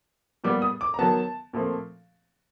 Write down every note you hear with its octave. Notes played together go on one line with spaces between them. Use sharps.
A#2 G3 B3 D6
D#6
D6
A#5
D#3 F#3 B3 A5
A#2 F3 A3 C4